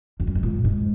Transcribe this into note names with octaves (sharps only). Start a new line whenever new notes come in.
F2
F#2
G#2
A#2
G#2